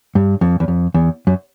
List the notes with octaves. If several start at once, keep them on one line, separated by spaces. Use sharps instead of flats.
G2
F2
E2
F2
E2
F#2